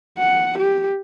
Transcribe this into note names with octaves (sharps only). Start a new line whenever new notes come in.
F#5
G4